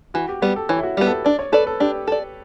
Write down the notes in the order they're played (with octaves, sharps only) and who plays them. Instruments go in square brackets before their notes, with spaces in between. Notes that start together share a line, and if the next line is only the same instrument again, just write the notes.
[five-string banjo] E3 [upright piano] F#4
[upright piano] G4
[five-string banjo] G3 B3 [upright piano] G4
[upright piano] A4
[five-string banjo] E3 [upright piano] C#5
[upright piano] E4
F#4
[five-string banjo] G3 B3 [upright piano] G4
[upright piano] A4
B4
[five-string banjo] D4 [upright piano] D5
[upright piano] C#5
[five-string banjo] A4 D5 [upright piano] B4
[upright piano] A4
[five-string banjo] D4 [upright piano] G4
[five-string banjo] A4 D5